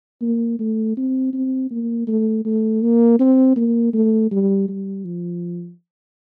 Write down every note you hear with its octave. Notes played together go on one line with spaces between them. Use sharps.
A#3
A3
C4
C4
A#3
A3
A3
A#3
C4
A#3
A3
G3
G3
F3